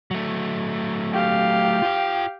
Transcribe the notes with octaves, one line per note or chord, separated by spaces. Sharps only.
F#3 A3
G4 F5
F4 G5